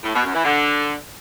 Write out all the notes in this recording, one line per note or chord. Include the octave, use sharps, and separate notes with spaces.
A2
B2
F#2
E3
D3